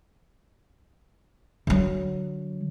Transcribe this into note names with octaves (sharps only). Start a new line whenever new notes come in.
D3 F#3